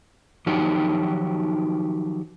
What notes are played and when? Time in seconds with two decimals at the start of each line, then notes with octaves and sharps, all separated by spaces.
0.46 D#3 F3 F#3 D#4 F#4 G4